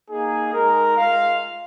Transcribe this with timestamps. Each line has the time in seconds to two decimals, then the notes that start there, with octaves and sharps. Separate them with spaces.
0.10 A#3 D#4 G#4
0.53 G#3 D#4 A#4
0.96 G#3 F4 F5